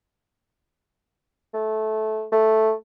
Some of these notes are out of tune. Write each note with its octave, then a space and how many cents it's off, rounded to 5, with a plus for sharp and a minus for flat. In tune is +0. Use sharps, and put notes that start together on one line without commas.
A3 -15
A3 +0